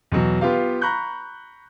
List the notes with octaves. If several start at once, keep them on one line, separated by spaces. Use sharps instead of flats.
E2 B2 F#3
B3 F4 G4 F5
A#5 B5 C#6 F#6 G6